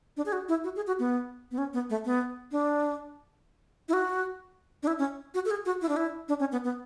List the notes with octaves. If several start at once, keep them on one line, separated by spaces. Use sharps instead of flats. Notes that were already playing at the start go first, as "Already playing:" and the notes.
D4
G#4
F#4
E4
F#4
G#4
F#4
B3
B3
C#4
B3
A3
B3
D4
E4
F#4
D4
E4
C#4
F#4
A4
G#4
F#4
E4
D4
E4
D4
C#4
B3
B3